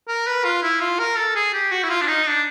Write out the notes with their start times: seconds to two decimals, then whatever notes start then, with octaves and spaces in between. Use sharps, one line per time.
0.08 A#4
0.27 B4
0.45 F4
0.63 E4
0.81 F4
0.99 A#4
1.17 A4
1.36 G#4
1.54 G4
1.72 F#4
1.83 E4
1.90 F4
2.01 D4
2.08 D#4
2.27 D4